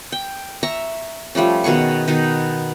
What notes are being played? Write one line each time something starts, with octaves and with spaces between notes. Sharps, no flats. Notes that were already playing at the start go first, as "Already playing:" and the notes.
G5
E5 A#5 C#6
F3 G3 A3 C#4
B2 D#3 G#4 C#6
B2 D#3 D#4